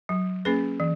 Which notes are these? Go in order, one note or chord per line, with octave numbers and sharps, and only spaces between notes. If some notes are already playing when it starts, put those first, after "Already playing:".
F#3
A#3 C#4 G#4 B4
E3